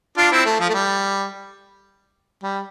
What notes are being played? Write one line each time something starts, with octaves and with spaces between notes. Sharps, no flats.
D4 F4
C4 E4
A3
F3
A3
G3
G3